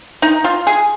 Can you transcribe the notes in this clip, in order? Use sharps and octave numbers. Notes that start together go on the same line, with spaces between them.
D#4
F4
G#4